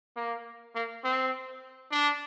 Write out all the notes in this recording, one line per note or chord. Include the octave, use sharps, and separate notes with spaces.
A#3
A#3
C4
D4